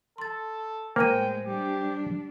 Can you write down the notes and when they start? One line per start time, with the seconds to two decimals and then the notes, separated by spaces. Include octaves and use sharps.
0.18 A4 C6 A6
0.96 A2 G#3 A#3 C5 G5 G#5 D#7
1.46 G3 D4 G4